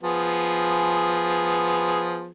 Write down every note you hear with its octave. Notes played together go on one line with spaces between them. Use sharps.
F3 B3 G#4